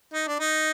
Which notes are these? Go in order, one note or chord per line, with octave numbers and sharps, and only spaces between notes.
D#4
D4
D#4